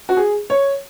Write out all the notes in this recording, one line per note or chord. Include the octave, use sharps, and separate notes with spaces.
F#4
G#4
C#5